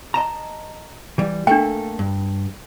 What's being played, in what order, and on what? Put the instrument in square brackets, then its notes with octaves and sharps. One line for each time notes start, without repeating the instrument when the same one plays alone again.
[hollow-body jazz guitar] D#5 A5 A#5
E3 G3
[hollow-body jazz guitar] A3 A#3 A4 [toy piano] D4 G5
[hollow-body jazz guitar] G2